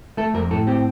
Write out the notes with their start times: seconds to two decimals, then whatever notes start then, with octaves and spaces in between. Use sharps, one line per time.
0.17 A3 A4
0.34 F2 A#4
0.50 A2 A4
0.67 C4 G4